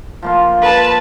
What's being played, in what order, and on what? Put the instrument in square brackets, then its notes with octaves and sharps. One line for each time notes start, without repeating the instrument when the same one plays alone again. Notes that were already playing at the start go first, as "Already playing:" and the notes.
[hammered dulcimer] F3 A#3 F4
[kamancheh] B4 A5